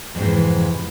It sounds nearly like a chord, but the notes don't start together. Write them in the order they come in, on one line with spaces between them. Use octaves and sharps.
F2 G#2 C3 E3